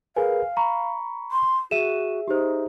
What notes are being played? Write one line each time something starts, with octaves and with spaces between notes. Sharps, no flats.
G#4 A#4 B4 F5 G#5
A#5 B5 C#6
C6
F#4 G#4 E5 D#7 E7
D#4 G4 C5